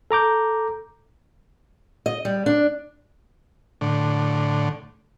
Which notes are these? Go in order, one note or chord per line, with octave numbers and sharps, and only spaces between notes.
A4 A#5 D6 G6
D#5
G3
D4
A2 D3